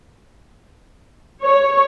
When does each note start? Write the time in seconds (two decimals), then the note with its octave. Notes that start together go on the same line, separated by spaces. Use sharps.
1.42 C#5